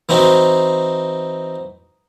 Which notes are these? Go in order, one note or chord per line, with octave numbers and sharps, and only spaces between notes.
E3 C4 D#4 F#4